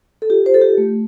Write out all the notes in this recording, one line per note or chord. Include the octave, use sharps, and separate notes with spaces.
A4
F4 G4
C5
A4
G4
A3